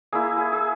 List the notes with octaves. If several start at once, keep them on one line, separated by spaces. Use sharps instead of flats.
A#3 E4 G#4
G#4
G#4